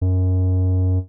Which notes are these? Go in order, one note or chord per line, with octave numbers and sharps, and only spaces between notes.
F#2